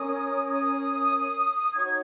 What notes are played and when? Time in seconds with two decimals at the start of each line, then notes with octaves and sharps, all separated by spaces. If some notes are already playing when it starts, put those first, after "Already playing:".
Already playing: C#4 A#4 C#5 D#6
0.52 D#6
1.73 D#4 F#4 C#5 G#6